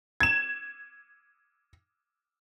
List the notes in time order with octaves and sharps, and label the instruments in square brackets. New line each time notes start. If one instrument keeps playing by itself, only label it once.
[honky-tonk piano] G#6 E7